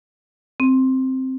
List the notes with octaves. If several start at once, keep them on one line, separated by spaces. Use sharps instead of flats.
C4